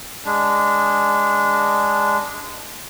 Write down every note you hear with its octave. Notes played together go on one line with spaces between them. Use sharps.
G#3 D4